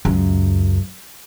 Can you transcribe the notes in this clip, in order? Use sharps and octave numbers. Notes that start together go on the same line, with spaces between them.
C#2 F#2